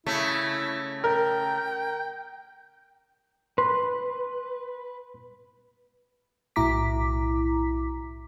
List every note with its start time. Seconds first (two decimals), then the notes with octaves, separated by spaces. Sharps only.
0.06 C#3 A3 E4
1.04 A#4 G5
3.58 B4 C6
6.56 B1 A2 E4 A#5 D6 B6